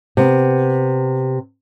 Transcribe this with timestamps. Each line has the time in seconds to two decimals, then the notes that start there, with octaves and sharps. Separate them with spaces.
0.17 C3 B3